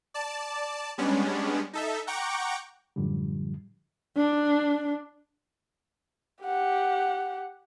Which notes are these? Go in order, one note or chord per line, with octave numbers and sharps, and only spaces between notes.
D5 A5
G3 G#3 B3 C#4 D4
D#4 A4 E5
F#5 G5 A#5 C#6 D6
F#2 A2 D3 F3 G3
D4
G4 F#5